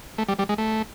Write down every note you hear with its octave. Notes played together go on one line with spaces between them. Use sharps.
A3
G3
G3
G#3
A3